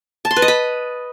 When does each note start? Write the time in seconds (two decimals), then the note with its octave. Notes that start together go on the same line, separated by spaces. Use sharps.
0.25 A5
0.31 C6
0.36 B4
0.42 D#5
0.48 B5